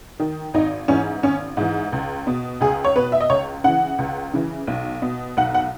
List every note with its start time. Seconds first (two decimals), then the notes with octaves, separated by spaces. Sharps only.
0.20 D#3
0.54 G#1 D#4
0.88 G#2 E3 C#4
1.22 G#1 C#4
1.57 G#2 E3
1.92 C#2
2.27 B2
2.61 C#2 G#4
2.84 C#5
2.96 B2 B4
3.12 E5
3.20 D#5
3.29 C#2 C#5
3.64 C#3 E3 F#5
3.98 C#2
4.33 C#3 E3
4.67 B1
5.02 B2
5.37 B1 F#5
5.54 F#5